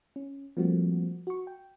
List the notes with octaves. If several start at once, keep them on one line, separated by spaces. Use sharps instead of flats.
C#4
F3 G3 A3 A#3 C4 F#4
F#4 C#6
G5